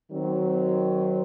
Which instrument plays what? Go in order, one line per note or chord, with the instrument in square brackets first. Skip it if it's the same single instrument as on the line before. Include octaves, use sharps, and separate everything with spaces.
[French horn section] D#3 F#3 C4